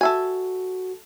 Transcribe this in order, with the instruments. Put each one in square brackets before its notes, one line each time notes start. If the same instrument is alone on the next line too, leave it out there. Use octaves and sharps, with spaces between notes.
[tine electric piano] F#4 [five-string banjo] A4 E5 G#5